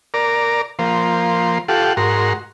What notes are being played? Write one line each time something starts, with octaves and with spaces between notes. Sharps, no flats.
A#4 D5
F3 A#3 C5
F4 G4 A4 F#5
G#2 F#4 A#4 C6